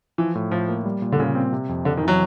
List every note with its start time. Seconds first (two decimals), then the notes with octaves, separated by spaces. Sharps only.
0.18 E3 F3
0.35 A2
0.51 A2 F3
0.68 A#3
0.85 G3
1.02 A#2
1.12 D3
1.19 A#2 C#3
1.35 C4
1.53 C3
1.69 F2
1.85 F2 D3
1.97 D#3
2.03 E3 F#3